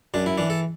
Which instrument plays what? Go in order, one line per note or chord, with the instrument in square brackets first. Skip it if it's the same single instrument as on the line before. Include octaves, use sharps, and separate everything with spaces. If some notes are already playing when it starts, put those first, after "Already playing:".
[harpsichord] F#2 D4
E4
E3 D4
A4